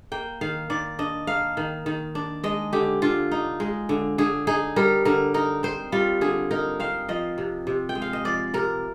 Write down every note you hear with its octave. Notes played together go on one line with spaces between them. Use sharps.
A#3 G5
D#3 F5
D#3 D5
D4 D#5
A#3 F5
D#3
D#3
D4
G#3 D#5
D3 G4
D3 F4
D#4
G#3
D3
D3 G#4
D#4 G#4
G3 A#4
D3 A#4
D#4 A#4
C4 C5
G3 F4
D3 G#4
D#4 A#4
C4 F5
F3 D#5
C3
C3
G5
G#3
F5
D#5
F3 D5
C3 A#4